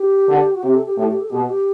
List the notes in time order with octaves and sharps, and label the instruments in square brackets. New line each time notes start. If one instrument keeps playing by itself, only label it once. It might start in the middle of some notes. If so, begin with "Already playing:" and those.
Already playing: [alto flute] G4
[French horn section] D3
[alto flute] F#4
[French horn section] C3 [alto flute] G4
[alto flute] A4
G4
[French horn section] A2 [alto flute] G4
[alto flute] G4
A4
[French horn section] B2 [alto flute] G4
[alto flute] F#4
G4